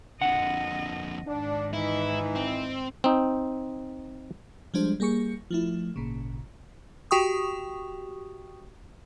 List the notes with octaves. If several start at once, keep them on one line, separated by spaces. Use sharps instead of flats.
F2 D3 D#5 F#5
G#2 D#3 D4
E3 D#4 E4
C4
C4 D#4
F3 G3 G#3 D4 C5
G3 A#3 G#4 C#6 C#7
F3 A3 E4
G#1 A#2 C#3
F#4 G4 G5 C#6 D#6